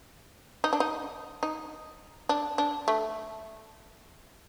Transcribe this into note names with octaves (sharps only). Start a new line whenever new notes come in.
D#4
D4
D#4
D#4
D4
D4
A3